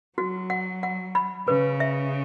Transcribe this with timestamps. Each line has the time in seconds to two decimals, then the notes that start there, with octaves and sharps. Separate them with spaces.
0.18 F#3 F#4
0.50 F#5
0.83 F#5
1.15 B5
1.48 C#3 B4
1.80 E5